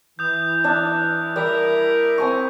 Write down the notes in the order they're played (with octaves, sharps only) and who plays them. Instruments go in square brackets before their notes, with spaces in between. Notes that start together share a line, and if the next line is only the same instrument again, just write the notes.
[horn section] E3 [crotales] D#6 G6
[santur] D4 D5 E5
[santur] G3 E5 E6 [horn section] E4 A#4
[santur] C4 G#5 C#6